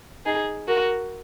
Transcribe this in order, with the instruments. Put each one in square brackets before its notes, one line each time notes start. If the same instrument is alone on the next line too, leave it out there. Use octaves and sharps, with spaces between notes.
[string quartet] D#4 G#4
F#4 A#4